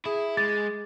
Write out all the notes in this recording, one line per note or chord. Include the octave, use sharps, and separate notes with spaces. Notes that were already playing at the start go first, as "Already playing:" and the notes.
E4 G#4
G#3 D6 A6